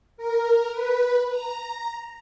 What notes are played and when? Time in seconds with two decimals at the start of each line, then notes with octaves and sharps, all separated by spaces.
0.17 A#4
0.72 B4
1.30 A#5